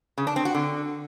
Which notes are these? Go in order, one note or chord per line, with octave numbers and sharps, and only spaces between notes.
C#3
D4
C4
F#4
D3